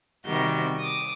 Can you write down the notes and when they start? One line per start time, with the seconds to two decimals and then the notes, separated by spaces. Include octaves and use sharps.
0.25 C3 D#3 G3 F#4 G6
0.78 D6 D#6